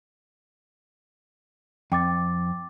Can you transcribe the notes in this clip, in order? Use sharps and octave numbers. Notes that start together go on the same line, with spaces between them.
F2 G5 D6 A6